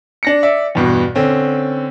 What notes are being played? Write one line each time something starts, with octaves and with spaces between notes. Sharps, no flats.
D4 A#6 C#7
D5 E5
E2 G2 B2
D3 C4 C#4